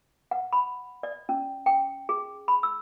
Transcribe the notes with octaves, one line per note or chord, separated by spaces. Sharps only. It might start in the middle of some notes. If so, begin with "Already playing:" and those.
F#5
B5
D5
C#4
G5
G#4
B5
E6